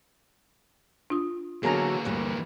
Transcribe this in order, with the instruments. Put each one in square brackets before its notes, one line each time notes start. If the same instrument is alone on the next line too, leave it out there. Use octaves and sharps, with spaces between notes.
[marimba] D4 F4 D#6
[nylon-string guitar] D3 F#3 [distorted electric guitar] E3 A#3 [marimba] B3 [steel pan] G#4 A#4 A#5
[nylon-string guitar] D2 G2 G3